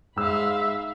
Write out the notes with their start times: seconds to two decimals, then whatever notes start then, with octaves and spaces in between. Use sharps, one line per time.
0.16 G#2 G#3 E5 F5 B5 E6